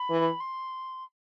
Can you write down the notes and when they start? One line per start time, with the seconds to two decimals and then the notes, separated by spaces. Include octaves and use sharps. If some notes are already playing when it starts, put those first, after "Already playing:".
Already playing: B5
0.10 E3
0.40 C6